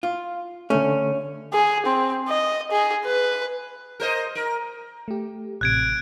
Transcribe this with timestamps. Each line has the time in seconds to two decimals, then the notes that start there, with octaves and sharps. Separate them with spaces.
0.03 F4
0.70 D3 A3 C#4
1.53 G#4
1.86 C4
2.28 D#5
2.71 G#4
3.05 B4
4.00 A#4 C5 D#5
4.35 A#4
5.08 A3 G4
5.61 A1 C3 F#6 G#6 D7